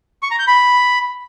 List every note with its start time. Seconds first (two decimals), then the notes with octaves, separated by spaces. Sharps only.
0.23 C#6
0.31 A#5
0.39 G6
0.47 B5